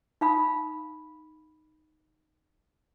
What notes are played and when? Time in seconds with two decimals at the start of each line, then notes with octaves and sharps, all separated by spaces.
0.21 D#4 F5 B5 D#6